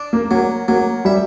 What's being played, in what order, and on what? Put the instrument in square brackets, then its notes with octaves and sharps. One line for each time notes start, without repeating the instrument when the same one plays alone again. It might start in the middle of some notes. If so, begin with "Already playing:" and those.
Already playing: [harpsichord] D4
[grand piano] A#3
[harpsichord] F#3 [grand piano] A#3
[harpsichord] F#3 [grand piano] A#3
[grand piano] G3 [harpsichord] E5